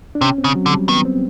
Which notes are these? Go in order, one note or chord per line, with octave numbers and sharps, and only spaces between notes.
D4
C3 C#4
C4
C#3
F#3
D3
G3
D#3 B3
C4